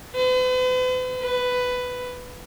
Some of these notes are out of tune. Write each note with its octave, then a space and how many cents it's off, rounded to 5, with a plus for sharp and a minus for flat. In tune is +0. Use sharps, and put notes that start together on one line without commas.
B4 +45
B4 +10